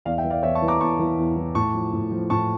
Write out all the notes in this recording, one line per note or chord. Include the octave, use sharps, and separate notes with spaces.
E2 D5 F5
E5 G5
E3
D5 F5
E2 C#5 E5
A5 C#6
E3
A#5 D6
E2 A5 C#6
E3
E2
E3
A2 A5 C#6
F3
A2
F3
A2 A5 C#6